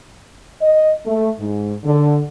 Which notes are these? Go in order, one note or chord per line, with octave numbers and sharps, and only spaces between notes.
D#5
A3
G#2
D3